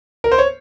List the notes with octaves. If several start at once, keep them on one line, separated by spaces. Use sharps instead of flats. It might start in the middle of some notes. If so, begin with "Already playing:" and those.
A#4
C5
C#5